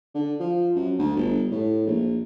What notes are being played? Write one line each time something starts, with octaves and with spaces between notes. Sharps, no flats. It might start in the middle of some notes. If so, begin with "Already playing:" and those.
D3
F3
F#2
D2
G1
A2
A#1